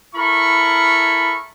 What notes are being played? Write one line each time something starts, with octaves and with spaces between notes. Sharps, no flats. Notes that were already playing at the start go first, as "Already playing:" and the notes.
E4 A4 A#4 B5 C#6